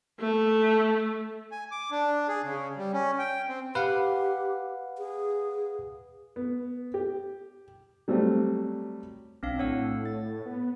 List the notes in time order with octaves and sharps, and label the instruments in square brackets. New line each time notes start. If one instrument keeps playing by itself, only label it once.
[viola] A3
[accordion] G#5
D6
D4
G#4
C#3
G3
C#4
G5
C4
[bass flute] G4 [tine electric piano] B4 F5 F#5
[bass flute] G#4
[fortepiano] B3
G4
F#3 G3 A3 C4
[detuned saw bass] B1 [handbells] C4 D4 F5
[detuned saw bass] A2 [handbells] C#5 F#5 E6
[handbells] A6
[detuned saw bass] B3